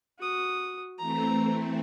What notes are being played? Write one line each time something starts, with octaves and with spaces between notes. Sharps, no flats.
F#4 D#6
E3 A3 C4 A#5